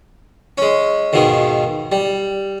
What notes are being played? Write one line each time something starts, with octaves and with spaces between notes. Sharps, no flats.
G#3 C#4
D#2 G#2 B2 D#3
G3